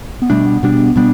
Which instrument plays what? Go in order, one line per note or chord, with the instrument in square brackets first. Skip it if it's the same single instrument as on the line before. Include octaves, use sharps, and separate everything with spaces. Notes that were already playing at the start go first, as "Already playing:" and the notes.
[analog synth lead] B3
[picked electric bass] B2 G3 D4 [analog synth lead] A3
[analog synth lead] B3
[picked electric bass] B2 G3 D4
[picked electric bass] B2 G3 D4 [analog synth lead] B3